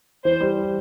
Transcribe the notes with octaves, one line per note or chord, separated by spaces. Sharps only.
E3 C5
G3